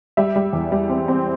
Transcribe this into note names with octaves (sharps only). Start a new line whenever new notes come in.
G3 E5
G3
E2
G3
C4
C4